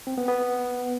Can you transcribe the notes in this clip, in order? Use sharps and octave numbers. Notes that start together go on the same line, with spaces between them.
C4
B3
B3